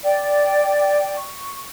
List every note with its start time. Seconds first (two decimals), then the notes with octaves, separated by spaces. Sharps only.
0.03 D5 G5
1.16 C#6